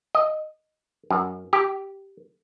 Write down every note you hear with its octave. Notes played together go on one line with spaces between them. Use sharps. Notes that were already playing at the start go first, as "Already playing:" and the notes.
D#5
F#2
G4